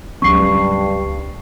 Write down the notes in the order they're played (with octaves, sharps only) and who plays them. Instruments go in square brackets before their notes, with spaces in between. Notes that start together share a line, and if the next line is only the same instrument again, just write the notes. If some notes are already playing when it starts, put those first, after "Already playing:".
[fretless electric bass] C#2 F#3 C#4 [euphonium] G2 [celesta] C#6 C7